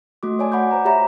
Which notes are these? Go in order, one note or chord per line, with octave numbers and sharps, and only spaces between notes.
A3 F#4 D6
C#5 D5 G#5 A5 D6
F#5 B5 C#6 D6 G6
C5 A#5
G4 C#5 E5 A#5 B5